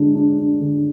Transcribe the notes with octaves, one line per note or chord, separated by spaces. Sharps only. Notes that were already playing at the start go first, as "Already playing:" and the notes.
Already playing: D3 G#3 D4
D4
D4
D3